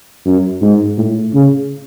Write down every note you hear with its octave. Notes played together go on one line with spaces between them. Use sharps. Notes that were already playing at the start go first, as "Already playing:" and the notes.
F#2
G#2
A2
C#3